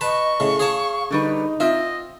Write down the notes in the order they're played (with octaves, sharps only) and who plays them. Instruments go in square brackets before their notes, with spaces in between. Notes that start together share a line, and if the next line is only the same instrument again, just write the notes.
[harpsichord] B4 A5 [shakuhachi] D#5 [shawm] C#6
[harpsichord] A2 C#3
[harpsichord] G#4 C#5 A5 [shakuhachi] F5
[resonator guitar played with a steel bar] D3 G3 B4 [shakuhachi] D#4
[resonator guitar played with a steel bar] C4 E5 [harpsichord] F4 [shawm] D#5